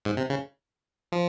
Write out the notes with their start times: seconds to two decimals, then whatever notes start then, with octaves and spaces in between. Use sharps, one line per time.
0.05 G#2
0.17 C3
0.30 C#3
1.12 F3